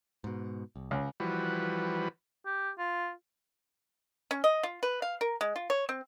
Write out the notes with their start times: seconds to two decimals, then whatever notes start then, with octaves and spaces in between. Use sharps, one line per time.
0.24 G#2 B2
0.76 C2
0.91 C#2
1.20 E3 F3 G3 F#4 B4
2.46 G4
2.78 F4
4.31 C#4
4.44 D#5
4.63 F4
4.83 B4
5.02 F5
5.21 A#4
5.41 G#3
5.56 F4
5.70 C#5
5.89 C4